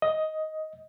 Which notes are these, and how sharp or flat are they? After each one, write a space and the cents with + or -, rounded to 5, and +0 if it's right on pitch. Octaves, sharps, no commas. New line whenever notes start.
D#5 +10